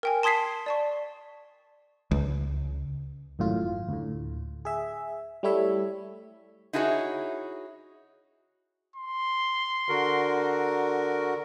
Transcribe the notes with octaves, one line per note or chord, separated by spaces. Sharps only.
A#4 G5 G#5
A5 C6 D#6 G#6 B6 C7
D5 A5 C#6
C#2
G#1 F#2 A2 F4
D2 A2
G#4 E5
G3 A3 E4 C#5 E5
D#4 E4 F#4 G#4 A4 C#5
C6
D3 F#4 A#4